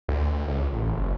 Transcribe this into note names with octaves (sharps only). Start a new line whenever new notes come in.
D2
C#2
A1
F#1